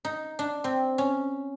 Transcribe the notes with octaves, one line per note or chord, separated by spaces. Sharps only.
D#4
D4
C4
C#4